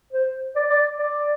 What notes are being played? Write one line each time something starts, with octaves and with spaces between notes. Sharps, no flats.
C5
D5
D5
D5